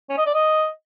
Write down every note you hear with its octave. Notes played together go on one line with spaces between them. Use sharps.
C#4
D#5
D5
D#5